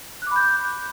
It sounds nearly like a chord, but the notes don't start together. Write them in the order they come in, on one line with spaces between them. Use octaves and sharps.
F#6 D6 B5 G6